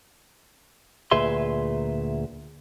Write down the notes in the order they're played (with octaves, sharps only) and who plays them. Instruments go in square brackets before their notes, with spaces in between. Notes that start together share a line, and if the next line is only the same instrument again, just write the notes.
[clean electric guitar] D2 A#2 G#4 B4 E5 C6